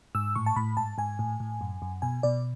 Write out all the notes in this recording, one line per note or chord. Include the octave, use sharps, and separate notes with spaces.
G#2 E6
A2 C#6
A5
A2 B5
G#2 A5
G#2 G#5
A2
A2
F#2
F#2
B2 G#5
B2 D5